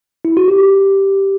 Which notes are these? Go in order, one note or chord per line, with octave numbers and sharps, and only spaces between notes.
E4
F#4
G4